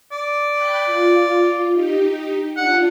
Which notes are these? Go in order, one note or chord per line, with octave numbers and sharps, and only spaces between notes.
D5
G5 B5 F#6
F4
D#4 G4
D4 F4 F#5